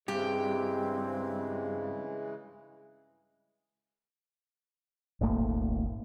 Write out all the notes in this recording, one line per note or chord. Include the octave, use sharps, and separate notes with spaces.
G2 C#3 E3 G#3 C4 G4
D#1 G#1 A3 A#3